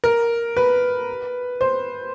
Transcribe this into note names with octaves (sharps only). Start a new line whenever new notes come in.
A#4
B4
C5